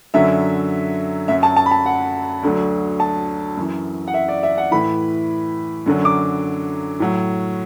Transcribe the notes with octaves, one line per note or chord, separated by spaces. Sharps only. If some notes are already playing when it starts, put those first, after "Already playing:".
F#2 D3 F#3 E5
F#2 F#3 E5
A5
A5
B5
A5
F#5
D2 D3 F#3
A5
F#2 E3
F#5
E5
D5
E5
F#5
A2 E3 B5
F#2 D3 F#3
D6
A2 F#3